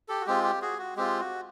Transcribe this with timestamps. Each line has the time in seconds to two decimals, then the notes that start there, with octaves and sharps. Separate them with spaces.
0.09 G4 A4
0.21 F#4
0.27 G#3 C4 F4 G4
0.44 G4
0.62 F#4 G#4
0.79 F#4
0.96 G#3 C4 F4 G4
1.20 F#4